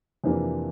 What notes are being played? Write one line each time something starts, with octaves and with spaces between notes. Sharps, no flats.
F2 C3 E3 A#3 D4